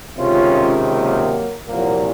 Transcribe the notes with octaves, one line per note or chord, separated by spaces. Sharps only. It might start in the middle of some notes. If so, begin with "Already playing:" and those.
C#2 C3 D#3 C#4 F4
F#3 A#3
C2 A#2 F3 F#3 A#3